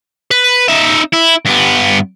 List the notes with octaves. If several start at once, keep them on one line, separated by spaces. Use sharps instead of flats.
B4
D#4 E5
E4
G2 B3